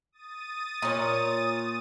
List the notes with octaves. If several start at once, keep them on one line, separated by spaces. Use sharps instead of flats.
D#6 A6 D#7
A#2 C#5